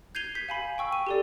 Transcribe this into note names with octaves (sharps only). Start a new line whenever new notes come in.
G6 G#6 C7 D#7 F7 G7
G6 B6
F5 G#5 B5
G5 C#6 E6
D#7
G4 A4 D5